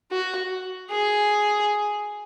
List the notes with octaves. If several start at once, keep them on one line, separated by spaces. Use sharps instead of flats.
F#4
G#4